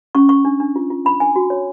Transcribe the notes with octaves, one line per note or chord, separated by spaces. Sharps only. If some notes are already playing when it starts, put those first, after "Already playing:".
C#4 C#6
C#4 C#6
D4
D4
F4
F4
D4 B5
D4 G#5
F#4
C#5